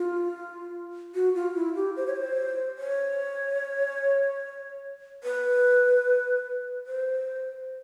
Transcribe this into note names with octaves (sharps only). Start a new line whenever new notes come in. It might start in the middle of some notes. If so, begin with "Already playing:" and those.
Already playing: F4
F#4
F4
E4
G4
C5
C#5
C5
C#5
B4
C5